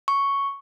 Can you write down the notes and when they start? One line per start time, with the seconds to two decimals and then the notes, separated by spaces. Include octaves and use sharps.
0.08 C#6